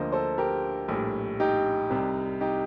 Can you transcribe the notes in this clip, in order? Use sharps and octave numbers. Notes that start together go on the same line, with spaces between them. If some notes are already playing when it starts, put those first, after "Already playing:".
Already playing: D2 D3 F3 A#3 C5 D#5
A4 C5
G4 A#4
A#1 A2 G3
D#4 G4
C2 C3 G3
D#4 G4